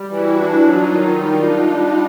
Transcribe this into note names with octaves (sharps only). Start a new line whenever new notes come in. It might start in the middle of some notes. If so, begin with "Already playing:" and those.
Already playing: G3
E3 E4 F#4
D4
F#3 D#4 F4
D#3
G3 D#4 F4
D4
G3 D#4 F4